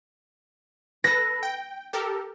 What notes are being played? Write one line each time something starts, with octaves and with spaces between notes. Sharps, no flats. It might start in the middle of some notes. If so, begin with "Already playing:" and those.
A4 B4 A#6
G5
G4 A4 A#4